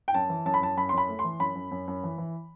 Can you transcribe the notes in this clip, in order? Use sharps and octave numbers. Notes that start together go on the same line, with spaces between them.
G5
F#2 A5
E3
F#2 A5
B5
F#2 A5
F#2 B5
C6
F#2 B5
A3
C6
E3
F#2 B5
F#2
F#2
F#2
E3
E3